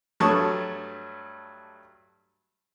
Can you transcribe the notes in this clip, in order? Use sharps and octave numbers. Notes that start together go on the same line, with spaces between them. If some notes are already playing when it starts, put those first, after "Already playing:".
G2 F#3 A3 A5 C#6 D#6